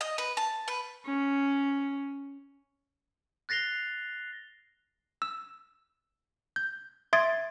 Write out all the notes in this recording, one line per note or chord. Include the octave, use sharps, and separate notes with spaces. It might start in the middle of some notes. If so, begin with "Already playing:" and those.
D#5
B4
A5
B4
C#4
F#6 A6 A#6 C7 F7 G7
E6
G6
E5 C6 D#6 G#6 A6 D7